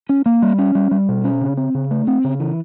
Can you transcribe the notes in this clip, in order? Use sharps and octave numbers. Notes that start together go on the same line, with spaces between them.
C#4
A#3
G3
C#4
G3
G3
B2
C#4
C#3
C4
C#3
A3
C4
C#3
E3